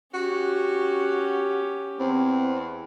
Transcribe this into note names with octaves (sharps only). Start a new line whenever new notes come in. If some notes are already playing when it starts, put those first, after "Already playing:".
C#4 F#4 G4
E2 C4